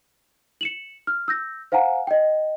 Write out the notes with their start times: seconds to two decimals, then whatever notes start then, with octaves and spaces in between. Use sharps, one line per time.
0.61 C#7 E7 F#7
1.07 F6
1.28 E6 G6 A#6
1.72 C5 F5 F#5 G#5 A#5
2.07 D#5 G5